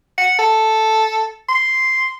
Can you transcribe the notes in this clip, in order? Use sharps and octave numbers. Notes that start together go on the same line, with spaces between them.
F#5
A4
C6